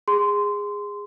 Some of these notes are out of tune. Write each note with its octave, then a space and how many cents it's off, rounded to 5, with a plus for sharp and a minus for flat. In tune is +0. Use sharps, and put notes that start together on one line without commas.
G#4 -15 C6 -15